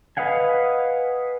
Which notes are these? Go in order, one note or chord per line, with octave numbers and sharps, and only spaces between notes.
B4 D#5 F5 F#5 G#5